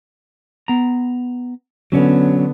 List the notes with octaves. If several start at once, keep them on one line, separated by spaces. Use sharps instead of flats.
B3 A#5
D3 F#3 B3 C#4 C#5